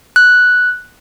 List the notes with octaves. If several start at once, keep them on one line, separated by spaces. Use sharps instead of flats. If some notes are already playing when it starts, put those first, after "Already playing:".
F#6